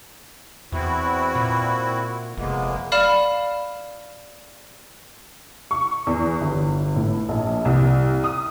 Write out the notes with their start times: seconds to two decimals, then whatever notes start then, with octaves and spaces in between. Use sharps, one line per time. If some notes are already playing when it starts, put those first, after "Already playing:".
0.72 E2 C4 E4 F#4
1.35 A#2
2.38 F1 G#3 A#3 B3
2.92 D5 F5 B5 F6 E7
5.71 C#6
6.07 E2
6.41 G1
6.96 A2
7.29 A#1
7.65 C2
8.24 D#6